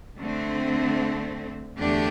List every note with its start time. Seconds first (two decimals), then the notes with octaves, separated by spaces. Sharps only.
0.20 D3 A3 C4
1.79 E2 D3 A3 D4 G4